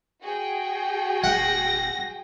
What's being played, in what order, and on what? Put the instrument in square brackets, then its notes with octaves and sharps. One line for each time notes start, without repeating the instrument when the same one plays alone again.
[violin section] F#4 G#4 G5
[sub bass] D1 [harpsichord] F#5 [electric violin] A#6